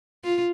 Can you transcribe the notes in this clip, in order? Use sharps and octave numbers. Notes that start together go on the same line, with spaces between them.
F4